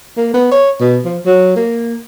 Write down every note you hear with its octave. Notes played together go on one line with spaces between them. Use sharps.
A#3
B3
C#5
B2
F3
F#3
A#3